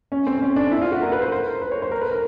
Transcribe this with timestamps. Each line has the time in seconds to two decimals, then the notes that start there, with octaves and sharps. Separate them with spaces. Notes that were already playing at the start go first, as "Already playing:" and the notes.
0.12 C#4
0.27 C4
0.42 C#4
0.56 D4
0.71 E4
0.82 F4
0.92 F#4
1.02 A#4
1.12 B4
1.22 C5
1.32 C5
1.47 A#4
1.62 B4
1.71 C#5
1.82 C5
1.91 A#4
2.02 B4
2.11 A#4